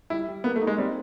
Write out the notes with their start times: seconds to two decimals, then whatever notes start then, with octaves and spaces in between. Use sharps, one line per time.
0.10 G3 E4
0.28 G3
0.44 A#3 B3
0.56 A3
0.62 D#4
0.67 G#3
0.78 G3 C4